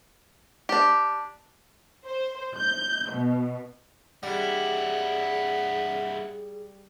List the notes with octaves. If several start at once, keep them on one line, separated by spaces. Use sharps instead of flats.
D4 G4
C5
G6
B2
G2 G3 E4 G#4 F#5